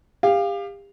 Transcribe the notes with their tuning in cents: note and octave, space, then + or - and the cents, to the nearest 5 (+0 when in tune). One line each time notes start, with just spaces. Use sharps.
G4 +35 F5 +0